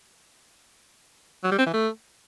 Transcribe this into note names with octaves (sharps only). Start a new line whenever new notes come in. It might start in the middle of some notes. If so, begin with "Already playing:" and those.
F#3
G3
C4
E3
A3